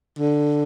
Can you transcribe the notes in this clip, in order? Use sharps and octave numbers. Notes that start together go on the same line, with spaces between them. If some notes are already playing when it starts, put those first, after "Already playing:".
D3